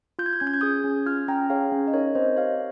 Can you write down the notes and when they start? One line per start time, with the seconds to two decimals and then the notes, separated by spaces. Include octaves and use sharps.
0.19 F4 G6
0.26 G#6
0.33 G6
0.40 C#4 G#6
0.47 G6
0.54 G#6
0.61 G#4 D#6 G6
0.84 C#4
1.06 F4 F6 G#6
1.28 C#4 G5 A#5
1.50 G#4 C#5 F5
1.72 C#4
1.88 D#5
1.93 D#4 A#4 C#5
2.15 C4 C5 D#5
2.37 G4 C#5 F5